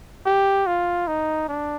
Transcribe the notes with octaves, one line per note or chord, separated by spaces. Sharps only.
G4
F4
D#4
D4